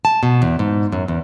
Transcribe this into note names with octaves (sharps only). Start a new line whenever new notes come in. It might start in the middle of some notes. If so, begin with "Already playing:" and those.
A5
B2
E2
G#2
F#2
E2